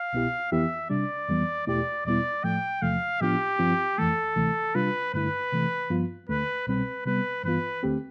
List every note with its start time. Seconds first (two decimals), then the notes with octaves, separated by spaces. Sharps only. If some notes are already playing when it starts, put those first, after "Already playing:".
Already playing: F5
0.13 C2 B2 B3 E4 G4
0.52 F2 E3 B3 E4 G4 E5
0.90 C3 G3 D4 D5
1.29 F2 E3 G3 B3
1.67 E2 B2 A3 E4 G4 D5
2.05 E2 B2 G3 B3 E4 D5
2.44 A2 F3 A3 G5
2.82 E2 C3 F3 A3 F5
3.21 A2 F3 B3 D4 F4 G4
3.59 G2 F3 C4 F4
3.98 F2 E3 A3 A4
4.36 D2 C3 E3 A3
4.75 C3 G3 D4 F4 B4
5.14 G2 D3 A3 E4 B4
5.52 C3 E3 A3
5.90 G2 F3 B3 F4
6.29 D2 D3 A3 B4
6.67 C2 B2 G3 C4 B4
7.06 C3 G3 B3 B4
7.44 G2 E3 B3 F4 B4
7.83 D2 D3 A3 C4 G4